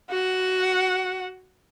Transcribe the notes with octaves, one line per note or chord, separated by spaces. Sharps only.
F#4 F#5